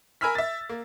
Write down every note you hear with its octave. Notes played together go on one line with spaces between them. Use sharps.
A#4 G#5 B5 E6 F6 B6
E5 A6
A#3